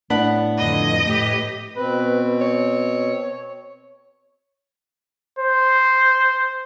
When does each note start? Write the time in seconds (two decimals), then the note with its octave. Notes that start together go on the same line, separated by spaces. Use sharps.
0.10 A2 B3 D4 F#5 B5
0.58 F2 D3 D#5
1.03 A2 G4 B4
1.76 B2 C4 B4
2.41 C#5
5.39 C5